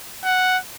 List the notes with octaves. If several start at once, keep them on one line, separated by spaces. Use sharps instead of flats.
F#5